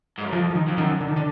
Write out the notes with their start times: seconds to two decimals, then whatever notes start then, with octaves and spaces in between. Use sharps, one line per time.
0.18 G#2
0.25 F#2
0.32 F2 F3
0.50 F3
0.55 D#3
0.68 F2
0.77 F#2 D#3
1.01 D3
1.08 D#3
1.16 D3